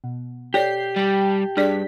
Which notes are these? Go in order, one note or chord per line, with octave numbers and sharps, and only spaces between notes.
B2
G4 A4 C#5 D5 G6 C7
G3 G5 A5
G2 D4 G#4 D5 B6